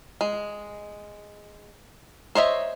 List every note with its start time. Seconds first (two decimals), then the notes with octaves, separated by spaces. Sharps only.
0.21 G#3
2.35 C5 C#5 D#5 E5